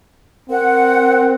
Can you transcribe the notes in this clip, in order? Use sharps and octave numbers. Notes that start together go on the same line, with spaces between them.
C4 A#4 F#5